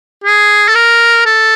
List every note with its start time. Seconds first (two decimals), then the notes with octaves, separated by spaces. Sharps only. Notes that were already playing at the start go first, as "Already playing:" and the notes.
0.24 G#4
0.69 A4
0.75 A#4
1.26 A4